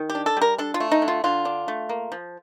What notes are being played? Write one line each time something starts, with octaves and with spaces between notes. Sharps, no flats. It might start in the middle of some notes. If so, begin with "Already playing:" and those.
Already playing: D#3
G4
D4
A4
G3 A#4
D4 A4
F4
A3
D#4
D3
F4
D3 F4
D4
A3
A#3
F3